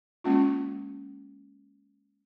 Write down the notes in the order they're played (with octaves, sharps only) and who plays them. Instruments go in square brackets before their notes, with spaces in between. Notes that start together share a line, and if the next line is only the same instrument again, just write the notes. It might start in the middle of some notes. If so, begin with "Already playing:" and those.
[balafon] G#3 A#3 C#4 F4